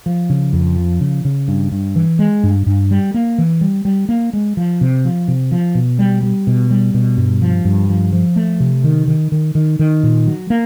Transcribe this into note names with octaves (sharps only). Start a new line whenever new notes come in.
F3
C#3
F2
F3
C#3
C#3
G2
G2
E3
G#3
G2
G2
G3
A#3
E3
G3
G3
A#3
G#3
F3
C3
F3
C3
F3
B2
G3
G3
B2
G3
B2
G2
F3
G2
F3
F3
A3
C3
D#3
D#3
D#3
D#3
D#3
A#2
F#3
A#3